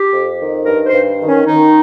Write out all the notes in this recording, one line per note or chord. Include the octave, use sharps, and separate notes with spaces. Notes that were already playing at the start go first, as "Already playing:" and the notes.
Already playing: G4
F2
D#3
G2 A#4
C5
G2
D#3
C#4
D#3 D#4